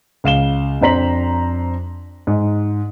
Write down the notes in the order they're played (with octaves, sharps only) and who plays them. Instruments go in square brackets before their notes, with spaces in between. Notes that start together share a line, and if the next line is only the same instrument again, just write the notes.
[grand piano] C#2 F5 E7 G7
F2 D4 C5 A#5 B6 F#7
G#2